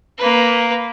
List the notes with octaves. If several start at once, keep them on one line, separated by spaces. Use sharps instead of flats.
A#3 B4